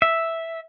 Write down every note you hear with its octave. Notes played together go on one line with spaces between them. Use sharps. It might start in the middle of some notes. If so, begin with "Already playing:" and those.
E5